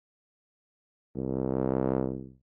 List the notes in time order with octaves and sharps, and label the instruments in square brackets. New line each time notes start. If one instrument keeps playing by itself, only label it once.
[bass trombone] C2